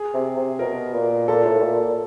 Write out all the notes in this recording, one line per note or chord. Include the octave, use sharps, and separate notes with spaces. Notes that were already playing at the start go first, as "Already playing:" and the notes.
Already playing: G#4
C3
C3
B2 A#4
A#2
A#2 A4
A2
A#2
A#2